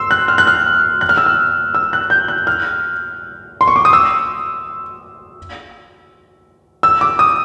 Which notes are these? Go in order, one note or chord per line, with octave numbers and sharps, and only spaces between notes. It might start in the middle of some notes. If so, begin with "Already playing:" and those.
Already playing: C6 E6
F#6
F6
F#6
F6
F#6
F6
E6
F6
E6
F#6
G6
F#6
F6
C6
C#6
D6
D#6
E6
E6
D6
D#6